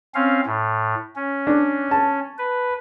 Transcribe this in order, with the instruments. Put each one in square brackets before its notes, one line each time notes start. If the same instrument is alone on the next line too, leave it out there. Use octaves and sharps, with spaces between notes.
[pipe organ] C4 C#4 F5
A2
C#4
[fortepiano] D4
A5
[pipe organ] B4